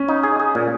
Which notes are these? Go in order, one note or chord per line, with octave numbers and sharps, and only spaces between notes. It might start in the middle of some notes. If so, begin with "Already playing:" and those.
Already playing: C#4
D#4
G#4
G#4
A#2